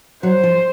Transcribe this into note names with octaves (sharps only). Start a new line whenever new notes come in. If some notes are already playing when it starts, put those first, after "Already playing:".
F#3 C5
F3